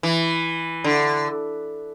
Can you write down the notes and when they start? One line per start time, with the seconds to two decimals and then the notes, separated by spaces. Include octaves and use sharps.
0.03 E3
0.84 D3